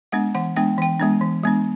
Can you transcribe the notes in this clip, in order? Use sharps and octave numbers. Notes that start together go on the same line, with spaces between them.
G#3 B3 D4 F#5
E3 F#5
G#3 B3 D4 G5
E3 G5
G#3 B3 D4
E3
G#3 B3 D4